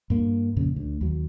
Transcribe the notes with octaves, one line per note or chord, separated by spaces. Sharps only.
G2 A#3
F2 A#2 C#3
D2
D#2 F#3